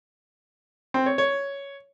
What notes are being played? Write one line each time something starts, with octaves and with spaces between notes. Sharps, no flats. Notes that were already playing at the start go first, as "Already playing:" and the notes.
C4
C#5
C#5